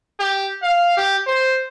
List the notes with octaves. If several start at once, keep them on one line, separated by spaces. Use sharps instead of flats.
G4
F5
G4
C5